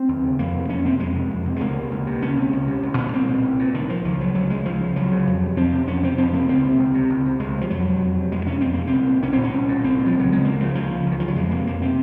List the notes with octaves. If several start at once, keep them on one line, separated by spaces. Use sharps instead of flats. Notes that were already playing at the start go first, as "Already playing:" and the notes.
Already playing: C4
D#2
C#3
F2 A#3
C3
F2 C#4
C3 C4
F2 G#3
C3
F2
C3
G#3
C#2 A#3
C3
C#2
C3
C#2 C#4
C3
C#2
C3
C2
A#2 C#4
C2 C4
A#2
C2
A#2
C2 D#3
A#2 F3
C#2 F3
C#3 F#3
C#2 F#3
C#3 G#3
C#2 F3
C#3
C#2 F#3
C#3
F2
C3
F2 C4
C3
F2 C#4
C3 C4
F2 C4
C3 A#3
C#2 C4
C3
C#2
C3
C#2
C3
C#2 G#3
C3
F3
F2 F#3
C3
F2
C3
F2 G#3
C3 C#4
F2 C4
C3 A#3
C4
C2
A#2
C2 C#4
C4
A#2
C#4
C2
A#2
C2 C4
A#2
F3
C#2
F#3
C#3 G#3
C#2 A#3
C#3 F3
C#2 F3
C#3
C#2
D#3
C#3 F3
F#3
F2 G#3
C3 A#3
F2 A#3
C3 C4